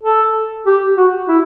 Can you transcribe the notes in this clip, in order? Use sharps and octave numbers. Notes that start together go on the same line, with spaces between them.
A4
G4
F#4
E4